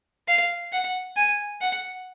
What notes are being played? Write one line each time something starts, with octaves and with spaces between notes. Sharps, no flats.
F5
F#5
G#5
F#5